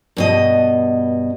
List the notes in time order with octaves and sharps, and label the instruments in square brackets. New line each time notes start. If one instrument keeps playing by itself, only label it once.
[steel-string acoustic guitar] G2 B2 D#5